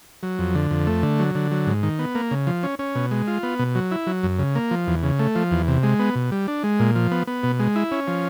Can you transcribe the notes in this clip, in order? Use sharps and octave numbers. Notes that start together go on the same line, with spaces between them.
F#3
F2
D3
F2
A3
D3
F#3
D3
F#3
G#2
D#3
B3
A#3
C#3
F3
C#4
C#4
B2
G#3
F4
B3
B2
F#3
E4
F#3
F#2
C#3
A#3
F3
E2
C#3
A3
F3
E2
C3
G#3
B3
B2
G3
D4
G#3
A#2
F3
B3
B3
B2
G#3
E4
C#4
F3